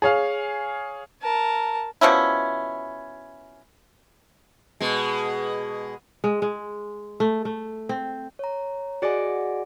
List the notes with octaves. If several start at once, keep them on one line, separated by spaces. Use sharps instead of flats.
G#4 C#5 F5
A#4 A5
B2 F3 C#4 E4
B2 G#3
G#3
G#3
A3
A3
C4
C#5 A#5
F#4 G#4 D5 D#5 F#5 G#5